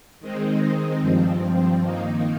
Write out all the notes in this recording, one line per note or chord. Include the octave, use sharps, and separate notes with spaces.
D#3 G#3 C4 D#4
G2 F3 C4
D#3 A#3 D#4